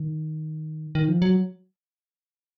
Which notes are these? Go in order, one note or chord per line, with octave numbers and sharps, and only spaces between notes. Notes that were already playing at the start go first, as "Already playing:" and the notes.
Already playing: D#3
D#3
F3
F#3